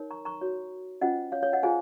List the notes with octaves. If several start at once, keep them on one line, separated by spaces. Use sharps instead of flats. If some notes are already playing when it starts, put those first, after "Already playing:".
Already playing: D#4 A#4 C#5
A#5 C#6
A#5 C#6
F#4 C#5
C#4 F4 C5 D#5 F#5
C#5 F5
C#5 F5
D#5 F#5
F4 G#4 C5 F5 G#5